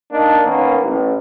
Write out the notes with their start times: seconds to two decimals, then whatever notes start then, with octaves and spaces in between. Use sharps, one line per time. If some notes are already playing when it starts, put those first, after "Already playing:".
0.12 A#3 D4 D#4
0.44 D#3 A#3 B3 C#4
0.82 A1